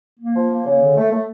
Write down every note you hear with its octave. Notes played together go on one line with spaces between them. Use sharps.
A#3
F3
A#3
C#3
D3
A3
A3